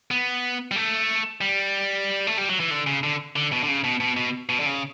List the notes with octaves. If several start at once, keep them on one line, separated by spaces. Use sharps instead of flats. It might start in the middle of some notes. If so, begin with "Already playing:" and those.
B3
G3
A3
G3
A3
G3
F#3
E3
D3
C#3
D3
D3
B2
D3
C#3
B2
B2
B2
B2
D3
C#3